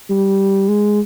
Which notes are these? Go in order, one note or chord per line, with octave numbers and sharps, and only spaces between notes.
G3
G#3